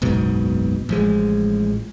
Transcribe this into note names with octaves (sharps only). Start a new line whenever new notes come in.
F#1 B1 G#2 B2
A1 F3 G#3